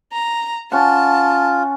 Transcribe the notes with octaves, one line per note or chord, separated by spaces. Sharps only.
A#5
C#4 F4 F#5 A5